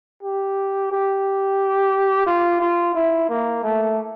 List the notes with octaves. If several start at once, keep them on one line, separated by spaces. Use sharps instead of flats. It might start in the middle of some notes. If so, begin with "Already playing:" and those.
G4
G4
F4
F4
E4
A#3
A3